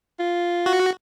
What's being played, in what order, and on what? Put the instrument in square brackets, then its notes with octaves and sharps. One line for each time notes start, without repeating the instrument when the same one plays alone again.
[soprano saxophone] F4
[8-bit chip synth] F#4